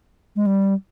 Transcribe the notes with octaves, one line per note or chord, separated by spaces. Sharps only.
G#3
G3